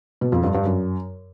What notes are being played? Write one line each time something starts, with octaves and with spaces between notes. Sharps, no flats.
B2
F2
G2
G2
F#2